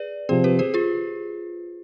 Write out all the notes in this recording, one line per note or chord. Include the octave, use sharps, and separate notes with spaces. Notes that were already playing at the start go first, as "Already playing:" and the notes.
Already playing: G#4 B4 D5
C3 F3 C4 G#4 C5
G4 B4
G#4 C5
F4 G#4